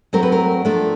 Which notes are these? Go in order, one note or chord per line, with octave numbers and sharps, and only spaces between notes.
F#3 A3 C4 A#4
B4
A#4
F3 A3 D4